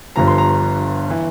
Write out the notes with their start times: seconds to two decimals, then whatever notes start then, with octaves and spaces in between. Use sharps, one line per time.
0.16 G1 G2 D3 F3 A#5
0.27 C6
0.38 A#5
1.10 E3